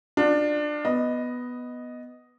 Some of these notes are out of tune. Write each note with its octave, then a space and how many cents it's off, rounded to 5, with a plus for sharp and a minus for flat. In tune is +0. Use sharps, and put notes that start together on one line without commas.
D4 +20 F4 +35
B3 +0 D#5 +0